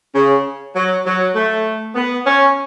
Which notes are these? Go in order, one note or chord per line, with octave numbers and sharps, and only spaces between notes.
C#3
F#3
F#3
A3
B3
C#4